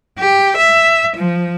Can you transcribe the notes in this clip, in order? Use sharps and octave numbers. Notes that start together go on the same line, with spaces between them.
G4
E5
F3